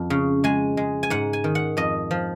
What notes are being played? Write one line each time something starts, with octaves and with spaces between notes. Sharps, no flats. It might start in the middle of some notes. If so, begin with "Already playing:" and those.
Already playing: F2
C#3
G#3 G#5
G#3
G#5
G#2 F#5
G#5
D#3
F#5
F2 D#5
F3